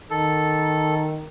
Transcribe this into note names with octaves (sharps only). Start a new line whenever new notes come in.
D#3 A4